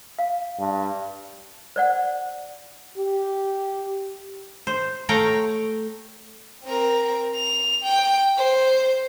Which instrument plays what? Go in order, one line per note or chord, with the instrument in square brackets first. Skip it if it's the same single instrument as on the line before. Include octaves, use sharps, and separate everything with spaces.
[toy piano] F5
[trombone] G2
[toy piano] C5 D5 F#5
[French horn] G4
[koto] C5
A3 C#5 F5 G5 A#5
[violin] C4 A#4
F7
G5
C5